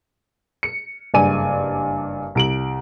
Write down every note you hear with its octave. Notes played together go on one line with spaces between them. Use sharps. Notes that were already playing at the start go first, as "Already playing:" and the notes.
C#7
F#1 G2 D5 G#5 D#7
C2 D7 F#7